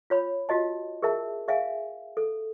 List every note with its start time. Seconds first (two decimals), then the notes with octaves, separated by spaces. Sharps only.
0.10 F4 C#5 B5
0.49 F4 F#4 D#5 A5
1.02 G#4 A#4 E5 A5
1.48 G#4 E5 F5 G#5
2.17 A4